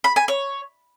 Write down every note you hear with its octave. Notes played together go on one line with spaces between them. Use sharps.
B5
G#5
C#5